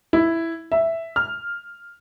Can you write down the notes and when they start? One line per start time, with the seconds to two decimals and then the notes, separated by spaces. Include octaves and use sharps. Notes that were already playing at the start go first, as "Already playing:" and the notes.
0.13 E4
0.72 E5
1.16 F6